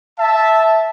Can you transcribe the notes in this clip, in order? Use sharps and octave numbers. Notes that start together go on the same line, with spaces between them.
E5 A5